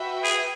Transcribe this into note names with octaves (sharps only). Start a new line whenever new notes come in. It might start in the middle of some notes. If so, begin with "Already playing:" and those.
Already playing: F#4 B4 E5 G5
G#4